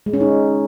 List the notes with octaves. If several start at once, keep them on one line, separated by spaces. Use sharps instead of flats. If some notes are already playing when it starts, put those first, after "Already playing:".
G#3
C#4
D#4